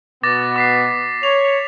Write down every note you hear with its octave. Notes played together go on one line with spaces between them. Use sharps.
B2 B3 D6 A6 A#6
D6 B6 C7
C#5 F7